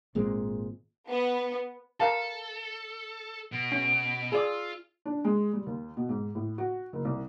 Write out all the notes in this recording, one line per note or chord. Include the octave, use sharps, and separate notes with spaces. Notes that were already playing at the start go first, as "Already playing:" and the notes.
G#1 A#2 G#3 C4
B3
A4 A#4 F5 A5
B2 D7
C#4
F4 G#4 D5 E6
D4
G#3
G3
D#2
B2
G#2
A2
F#4
F#1
C2